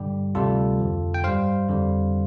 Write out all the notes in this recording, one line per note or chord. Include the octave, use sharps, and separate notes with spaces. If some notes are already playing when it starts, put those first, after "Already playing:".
Already playing: G2 D3 G3 G4
D2 C3 G3 F4 A4
F2 D3 F3
G5
G2 G3 C5 F5
F2 D3 G3